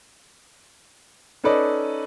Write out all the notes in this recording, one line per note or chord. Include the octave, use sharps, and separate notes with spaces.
C#4 D#4 A4 B4 D5 D#5